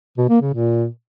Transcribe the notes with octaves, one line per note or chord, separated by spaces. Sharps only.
B2
A#3
C#3
A#2